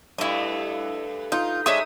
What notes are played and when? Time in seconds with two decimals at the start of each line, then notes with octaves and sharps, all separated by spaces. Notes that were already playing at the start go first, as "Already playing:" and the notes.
0.18 G2 A3 E4 D#5
1.32 D#4 F4
1.66 G#3 C#4 D4 E5 D#6